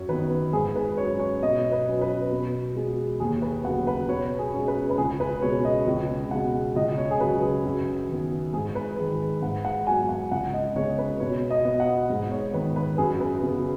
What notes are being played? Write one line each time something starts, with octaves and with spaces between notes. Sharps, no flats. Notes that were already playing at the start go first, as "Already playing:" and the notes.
Already playing: F#2 C#5
D#3 B3 B4
G#2 G#4
B4
F#3 C#4 C#5
C#5
B2 D#5
B4
F#3 C#4
B4
B2
G#3 B3
D#2 G#4
B4
C#3 F#3 B3 F#5
B4
B2 C#5
G#4
G#3 C#4
B4
B4
C#2 G#4
B4
B2 G#3 C#4 C#5
D#5
C#2
B2 G#3 F#5
C#2 D#5
C#5
G#4
C#3 F#3 B4
G#4
F#2
D#3 B3
G#2 G#4
B4
D#3 G#3
G#2 F#5
F#5
F#3 B3 G#5
F#5
C#2 F#5
D#5
C#3 G#3 B3 C#5
B4
B2 C#5
D#5
B3
F#5
G#2
C#5
D#3 B3 B4
B4
F#2 G#4
B4
C#3 B3